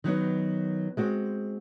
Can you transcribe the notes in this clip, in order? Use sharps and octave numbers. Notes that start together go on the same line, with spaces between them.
D#3 F#3 B3 D#4
G#3 C4 F#4